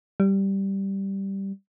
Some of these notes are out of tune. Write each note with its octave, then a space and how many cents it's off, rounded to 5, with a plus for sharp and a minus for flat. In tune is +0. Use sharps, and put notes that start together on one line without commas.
G3 -5